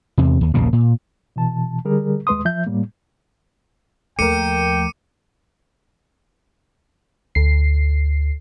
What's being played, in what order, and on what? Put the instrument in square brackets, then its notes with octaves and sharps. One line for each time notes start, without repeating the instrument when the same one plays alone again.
[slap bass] E2 C3
D#2
D#1 A#1 C#3 A#3
A#2
[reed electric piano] B2 E3 A5
D3 G3 G#4 A#4
D#2 G#3 B4 C6 D#6
F3 E5 G6
A2 G3 A#3
[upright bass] D#2 F3 [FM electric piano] A3 A#4 [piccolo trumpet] G5 [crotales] D6 C#7 D#7
[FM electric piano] D2 C7